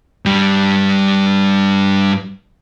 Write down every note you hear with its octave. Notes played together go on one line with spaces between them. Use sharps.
G2 G3